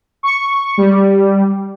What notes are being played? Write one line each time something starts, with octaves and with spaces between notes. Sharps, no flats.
C#6
G3